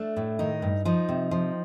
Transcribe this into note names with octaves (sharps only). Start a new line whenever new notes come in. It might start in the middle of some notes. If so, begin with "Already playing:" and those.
Already playing: A3 D4
A2
D#3 D#4
G2
F3 D#4
C3
F3